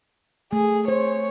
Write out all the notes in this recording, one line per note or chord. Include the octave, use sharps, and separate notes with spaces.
A3 G#4
C5 C#5